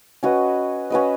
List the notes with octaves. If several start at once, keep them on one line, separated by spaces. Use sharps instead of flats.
C#4 F#4 B4 D#5
C#4 F#4 B4 D#5